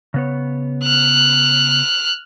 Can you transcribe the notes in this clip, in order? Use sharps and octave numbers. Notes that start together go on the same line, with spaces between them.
C#3 B3 C#5
F6 F#6